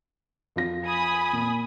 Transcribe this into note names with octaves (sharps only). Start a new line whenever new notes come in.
F2 F4 A#6
G#5 B5 D#6
A#2